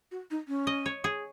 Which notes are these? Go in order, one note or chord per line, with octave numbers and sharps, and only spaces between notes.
F#4
D#4
C#4
D#5
C#5
G#4